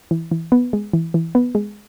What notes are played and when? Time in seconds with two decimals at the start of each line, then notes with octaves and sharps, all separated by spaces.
0.11 E3
0.31 E3
0.52 B3
0.73 G#3
0.93 E3
1.14 E3
1.35 B3
1.55 G#3